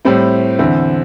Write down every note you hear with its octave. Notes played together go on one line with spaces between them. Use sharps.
A2 G3 C4 E4
E2 D3 C4 E4